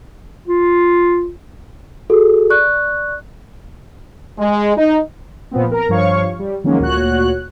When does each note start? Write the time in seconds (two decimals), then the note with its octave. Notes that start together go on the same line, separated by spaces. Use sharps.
0.48 F4
2.10 F#4 G#4 A4
2.50 D5 C#6 F#6
4.38 G#3
4.77 D#4
5.51 A#2 F3 B3 C4
5.71 A#4 A#5
5.89 G2 F3 C#5 F5 C#6
6.39 G3
6.64 D#3 F3 F#3 G#3 A#3 C#4
6.79 D2 A#2 F#4 C#5 F#6